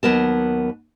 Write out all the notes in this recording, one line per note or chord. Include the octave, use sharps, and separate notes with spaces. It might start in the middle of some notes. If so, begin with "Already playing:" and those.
D#2 F#3 B3 A#4 A5